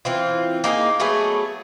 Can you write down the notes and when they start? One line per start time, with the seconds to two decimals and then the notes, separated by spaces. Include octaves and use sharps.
0.05 E3 C4 F4
0.64 A#3 D#4 G4 G#4
1.00 F#3 A3 B3 G#4